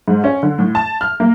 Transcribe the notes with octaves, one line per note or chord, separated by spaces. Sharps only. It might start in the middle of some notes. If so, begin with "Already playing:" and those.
G#2
C#4
D3
A2
A5
F6
A#3